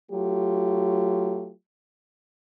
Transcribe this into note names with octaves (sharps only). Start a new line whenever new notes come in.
F#3 A3 F4 G4